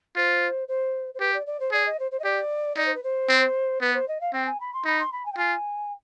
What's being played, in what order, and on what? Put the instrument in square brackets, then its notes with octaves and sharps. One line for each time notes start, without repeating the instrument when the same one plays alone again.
[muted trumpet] F4 [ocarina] C5
[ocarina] C5
C5
[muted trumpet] G4 [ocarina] B4
[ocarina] D5
D5
C5
[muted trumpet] G#4 [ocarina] D5
[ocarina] D#5
C5
C5
D#5
[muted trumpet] G4 [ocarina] D5
[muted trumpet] D#4 [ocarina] D5
[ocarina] C5
B4
C5
[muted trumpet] C4
[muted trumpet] B3 [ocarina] B4
[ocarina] C5
D#5
F5
[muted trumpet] C4 [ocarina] G5
[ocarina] G#5
B5
C6
[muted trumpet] D#4 [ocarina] B5
[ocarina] C6
B5
G#5
G5
[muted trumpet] F4 [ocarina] G#5